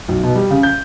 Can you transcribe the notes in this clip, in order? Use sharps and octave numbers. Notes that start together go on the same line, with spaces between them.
B1
B2
G3
C#3
G6